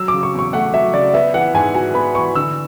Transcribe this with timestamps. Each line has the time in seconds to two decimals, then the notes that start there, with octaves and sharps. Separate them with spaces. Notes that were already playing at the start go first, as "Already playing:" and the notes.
Already playing: F#3 E6
0.08 C#3 D6
0.23 C#6
0.33 E2
0.39 C#6
0.53 A3 F#5
0.74 F#3 E5
0.94 C#3 D5
1.14 B3 E5
1.34 E3 F#5
1.54 G#2 G#5
1.75 F#4 G#5
1.94 B3 B5
2.15 E3 C#6
2.35 D3 E6